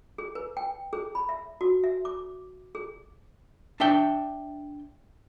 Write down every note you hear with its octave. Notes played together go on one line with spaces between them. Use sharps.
G#4
B4
G5
G#4
B5
E5
F#4
E5
D6
G#4
D4 E5 G5